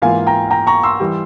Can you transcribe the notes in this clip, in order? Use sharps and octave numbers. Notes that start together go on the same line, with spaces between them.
G#2 E3 A#3 F4 F5 G#5
G5 A#5
G5 A#5
A#5 C#6
C6 E6
E3 G3